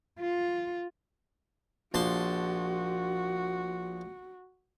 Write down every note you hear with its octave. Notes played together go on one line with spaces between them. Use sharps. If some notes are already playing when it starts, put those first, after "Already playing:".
F4
A#1 F#4 A5 C6